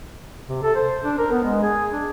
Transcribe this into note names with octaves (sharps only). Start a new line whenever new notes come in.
C3
A4
C5
D4
A#4
B3
G#3
G#4
D4